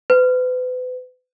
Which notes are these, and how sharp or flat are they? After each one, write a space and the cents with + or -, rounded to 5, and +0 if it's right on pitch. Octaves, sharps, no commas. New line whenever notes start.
B4 +40